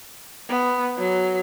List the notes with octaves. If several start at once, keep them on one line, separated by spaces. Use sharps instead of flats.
B3
F#3